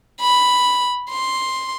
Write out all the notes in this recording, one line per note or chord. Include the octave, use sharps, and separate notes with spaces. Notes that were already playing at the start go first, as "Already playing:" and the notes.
B5
C6